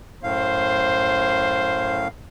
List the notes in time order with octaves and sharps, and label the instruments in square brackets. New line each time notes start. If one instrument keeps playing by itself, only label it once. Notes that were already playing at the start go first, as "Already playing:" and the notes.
[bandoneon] F#2 A2 F5 [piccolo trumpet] C5